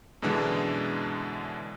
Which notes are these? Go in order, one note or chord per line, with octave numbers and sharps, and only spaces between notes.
F#2 B2 D3 E3 G#3 D4